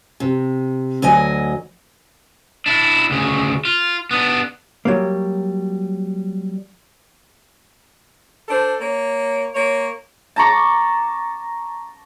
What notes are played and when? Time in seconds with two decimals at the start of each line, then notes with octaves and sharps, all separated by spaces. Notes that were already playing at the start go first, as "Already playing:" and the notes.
0.20 C3
1.02 D2 F#3 D#5 G#5
2.66 D4 E4
3.10 D2 C#3
3.65 F4
4.11 B3 D4
4.85 F#3 G3 A#3
8.48 D4 A4 C5
8.80 A#3 C#5
9.54 A#3 C#5
10.36 A5 A#5 C#6 D6